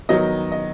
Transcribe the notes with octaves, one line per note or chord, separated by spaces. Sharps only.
D#3 F#3 B3 D#5
D#5